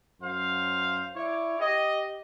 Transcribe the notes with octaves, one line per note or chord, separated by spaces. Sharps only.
F#2 C5 F5
E4 C#5 D5
G4 D#5